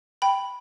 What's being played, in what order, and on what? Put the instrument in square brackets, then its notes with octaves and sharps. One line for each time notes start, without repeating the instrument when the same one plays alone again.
[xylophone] G5 B5